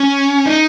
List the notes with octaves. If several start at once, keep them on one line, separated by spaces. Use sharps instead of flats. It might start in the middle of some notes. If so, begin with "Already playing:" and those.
Already playing: C#4
D#4